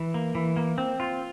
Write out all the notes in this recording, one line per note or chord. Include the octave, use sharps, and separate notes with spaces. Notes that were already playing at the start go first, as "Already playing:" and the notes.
Already playing: E3
A#3
E3
A#3
C4
F4